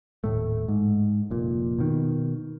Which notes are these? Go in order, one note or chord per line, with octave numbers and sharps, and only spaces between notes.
D#1 A2 A3
G#2
F1 A#2
B2 D#3